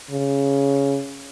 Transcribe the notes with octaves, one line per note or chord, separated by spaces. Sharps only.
C#3